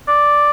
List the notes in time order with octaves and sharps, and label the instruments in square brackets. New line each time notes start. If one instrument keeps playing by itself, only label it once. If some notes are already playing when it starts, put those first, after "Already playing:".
[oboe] D5